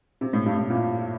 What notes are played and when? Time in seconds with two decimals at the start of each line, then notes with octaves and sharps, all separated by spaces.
0.21 C3
0.33 A2
0.46 G2
0.58 A2
0.70 A#2